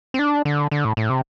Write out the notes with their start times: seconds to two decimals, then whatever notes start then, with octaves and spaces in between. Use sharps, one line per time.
0.14 C4
0.19 D4
0.45 D3
0.71 D3
0.85 A2
0.97 A2
1.10 C3